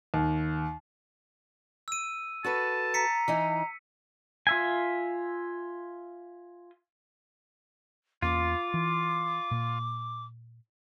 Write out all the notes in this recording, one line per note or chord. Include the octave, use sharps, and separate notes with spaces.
D#2
E6 D#7
F#4 A4 B4 A5
A#5 B6 C#7
E3 D#4
F4 E5 G#5
E2 A#3 C#4 F4 D6
E3
A#2